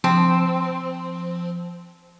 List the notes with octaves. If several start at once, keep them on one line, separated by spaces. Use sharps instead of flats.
F3 C4